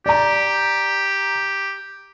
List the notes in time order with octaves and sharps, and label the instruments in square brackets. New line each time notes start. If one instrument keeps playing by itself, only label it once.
[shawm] G4 [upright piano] D5 A#5